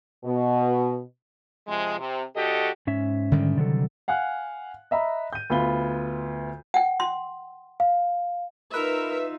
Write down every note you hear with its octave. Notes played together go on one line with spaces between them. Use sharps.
B2
C3 F3 G#3
C3
D2 F#4 G4 A4 D#5
G#2 C#4 E5
D3 D#3 G3
C3 F#3 A4
F5 F#5 G#5 F#6
D#5 E5 A#5 B5
G6 D#7
D2 B3 F4 B5 G7
F#5 G5
C6
F5
D#4 F4 A#4 B4 E5